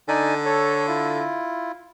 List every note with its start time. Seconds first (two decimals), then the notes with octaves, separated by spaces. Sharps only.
0.08 D3 D#4 D5 G#5
0.45 A4 C#5
0.87 E4 F4